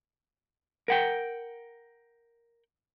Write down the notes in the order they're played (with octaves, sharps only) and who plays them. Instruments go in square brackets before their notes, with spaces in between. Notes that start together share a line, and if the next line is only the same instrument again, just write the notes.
[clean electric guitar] A#4 F#5 G5